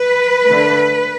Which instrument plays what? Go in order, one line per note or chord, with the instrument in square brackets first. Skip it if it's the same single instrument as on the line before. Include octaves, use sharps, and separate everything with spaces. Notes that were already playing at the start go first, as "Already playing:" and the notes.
Already playing: [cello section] B4
D3 A3